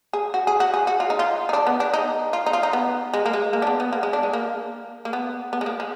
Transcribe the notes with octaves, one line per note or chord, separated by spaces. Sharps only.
G#4
F#4
G#4
F#4
G#4
F#4
F4
D#4
F4
D#4
D4
B3
D4
D#4
F4
D#4
F4
D#4
B3
G#3
A#3
G#3
A#3
D4
B3
B3
A#3
G#3
D4
G#3
A#3
A#3
B3
B3
G#3
A#3
G#3